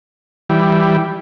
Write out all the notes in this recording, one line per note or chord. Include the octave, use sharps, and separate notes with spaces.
E3 G3